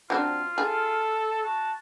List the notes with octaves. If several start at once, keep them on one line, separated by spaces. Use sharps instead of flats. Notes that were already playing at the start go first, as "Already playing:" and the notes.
F#3 C4 D4 F4
G#4 A4
F#4 A5